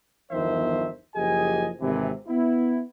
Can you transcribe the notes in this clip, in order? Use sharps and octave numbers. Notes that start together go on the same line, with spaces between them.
G1 E2 D#3 F3 C5 E5
F#1 F3 G4 G#4 D#5 G#5
G#1 C3 E3
B3 E4